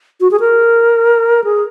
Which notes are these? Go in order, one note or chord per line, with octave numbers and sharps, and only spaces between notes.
F#4
G#4
A#4
G#4